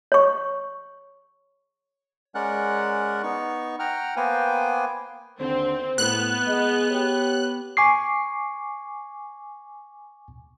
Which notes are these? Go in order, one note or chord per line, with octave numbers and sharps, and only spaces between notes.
C#5 C#6
G#3 C#4 A#4 D5 F#5 F#6
B3 D#4 C#6
F#5 G5 A#5 F6
A#3 B3 B4 C5 G5 G#5
D#2 D3 C4 C5
A2 B3 F#6
G#3 D#5
G4 C#5
G#5 C#6 D6 C7